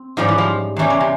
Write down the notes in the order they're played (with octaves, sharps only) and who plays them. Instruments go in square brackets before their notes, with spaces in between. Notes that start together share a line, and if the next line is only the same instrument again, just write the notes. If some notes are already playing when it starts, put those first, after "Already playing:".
Already playing: [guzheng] C4
[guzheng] G#2 G3 C#4 G4 [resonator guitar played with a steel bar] F3
[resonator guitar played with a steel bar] E3
F3
[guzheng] E2 E3 G3 C#4 G4
[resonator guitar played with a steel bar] C#3
C3